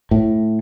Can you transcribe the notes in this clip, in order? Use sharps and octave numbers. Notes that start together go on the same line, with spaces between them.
A2